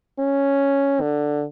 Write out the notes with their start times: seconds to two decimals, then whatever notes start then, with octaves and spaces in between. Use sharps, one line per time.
0.19 C#4
1.01 D3